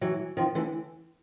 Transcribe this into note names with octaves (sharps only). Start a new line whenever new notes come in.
E3 F#3
D#3 F3
D3 E3